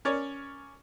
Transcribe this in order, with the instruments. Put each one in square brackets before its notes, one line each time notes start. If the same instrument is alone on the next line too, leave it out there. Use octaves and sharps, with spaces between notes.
[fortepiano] C#4 A#4 C#5 D5